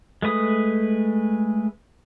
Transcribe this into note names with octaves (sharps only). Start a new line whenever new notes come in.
G#3 A3 B4 D#6